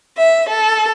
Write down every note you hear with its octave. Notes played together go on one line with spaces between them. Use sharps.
E5
A4